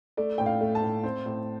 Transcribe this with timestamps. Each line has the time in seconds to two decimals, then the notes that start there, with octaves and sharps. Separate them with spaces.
0.17 A3 D5
0.38 A2 G5
0.46 F5
0.61 A3
0.75 A5
0.82 A2
1.03 C4
1.26 A2